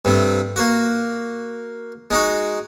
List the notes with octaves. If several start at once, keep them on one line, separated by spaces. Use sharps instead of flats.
G2 C3 A3
A#3 F#4
G#3 D#4 F#4